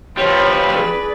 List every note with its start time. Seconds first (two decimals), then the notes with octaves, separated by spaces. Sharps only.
0.18 F3 G3 B4 C#5
0.74 G#4 D5